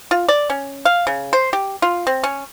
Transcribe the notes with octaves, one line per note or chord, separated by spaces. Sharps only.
F4
D5
C#4
F5
C#3
C5
G4
F4
C4
C#4